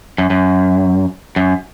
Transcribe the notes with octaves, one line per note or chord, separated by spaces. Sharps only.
F#2
F#2
F#2